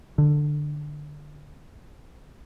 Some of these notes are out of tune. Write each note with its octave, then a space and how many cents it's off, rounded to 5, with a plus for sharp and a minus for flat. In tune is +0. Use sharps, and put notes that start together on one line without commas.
D3 +15